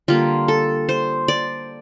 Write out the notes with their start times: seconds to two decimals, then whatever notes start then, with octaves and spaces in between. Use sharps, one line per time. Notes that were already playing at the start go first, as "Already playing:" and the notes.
0.08 D3 G3 A#3 F4
0.48 A4
0.89 C5
1.28 D5